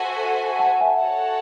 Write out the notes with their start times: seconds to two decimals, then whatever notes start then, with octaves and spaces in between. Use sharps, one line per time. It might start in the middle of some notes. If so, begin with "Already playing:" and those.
Already playing: F#4 A4 C5 E5 F#5 G#5 A5
0.59 F#5 A5
0.80 E5 G#5
1.00 F#4 A4 C#5 F#5 A5